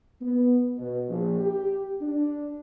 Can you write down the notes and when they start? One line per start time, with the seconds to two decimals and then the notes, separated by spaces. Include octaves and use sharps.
0.21 B3
0.77 B2
1.09 A#1
1.40 G4
2.01 D4